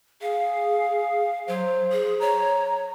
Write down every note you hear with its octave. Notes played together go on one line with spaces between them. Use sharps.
G#4 F5
F#3 C5
G#4
C#5 A#5